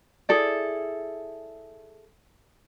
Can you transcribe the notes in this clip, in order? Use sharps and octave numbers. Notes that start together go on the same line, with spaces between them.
E4 G#4 A4 D5